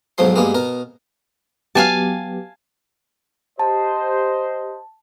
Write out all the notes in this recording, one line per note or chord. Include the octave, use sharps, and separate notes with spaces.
B1 G#2 F3 F#3 C6
G2 G#3 A#3 B3 F#4
B2 A#4
F#3 B3 G4 F5 G#5 A5
G4 C5 D#5 A5